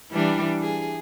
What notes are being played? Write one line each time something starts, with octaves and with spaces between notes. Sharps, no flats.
E3 G3 D4
G#4